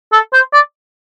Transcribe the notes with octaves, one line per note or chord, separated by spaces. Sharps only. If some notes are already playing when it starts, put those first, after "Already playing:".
A4
C5
D5